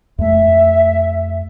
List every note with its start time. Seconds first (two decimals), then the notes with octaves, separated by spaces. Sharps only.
0.18 F2 A3 E5